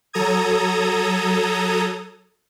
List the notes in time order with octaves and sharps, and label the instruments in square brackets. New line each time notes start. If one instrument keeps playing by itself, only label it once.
[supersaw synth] F#3 A4 A#5 D#6 G#6